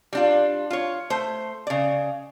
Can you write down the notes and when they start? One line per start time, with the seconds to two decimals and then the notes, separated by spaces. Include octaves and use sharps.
0.13 G3 D4 F4
0.70 F4 C#5
1.10 A3 C5
1.67 C#3 D5